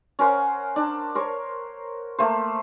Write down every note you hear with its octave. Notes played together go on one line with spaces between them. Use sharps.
C#4 A#4 C5 F#5
D4
A#4 C5 C#5
A3 A#3 C5